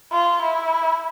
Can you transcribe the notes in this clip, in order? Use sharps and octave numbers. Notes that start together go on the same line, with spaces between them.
F4
E4